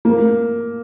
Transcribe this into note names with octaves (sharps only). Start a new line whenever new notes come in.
A#3